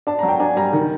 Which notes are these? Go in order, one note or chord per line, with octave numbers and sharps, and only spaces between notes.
D4 A5
F#3 A#5
G5
D4 G#5
G3 A#5
D#3